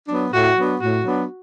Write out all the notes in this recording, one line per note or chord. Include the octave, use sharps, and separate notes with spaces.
F#3 B3 D4
A2 F#4
F#3 B3 D4
A2 F#4
F#3 B3 D4